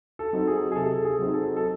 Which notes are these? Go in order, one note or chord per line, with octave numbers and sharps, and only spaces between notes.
A4
F#3 C4 D#4
G#4
G#4
C3 A4
G#4
F#3 C4 D#4
A4
A4